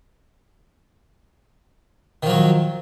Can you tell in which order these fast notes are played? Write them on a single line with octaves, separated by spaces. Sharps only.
D#3 F3 F#3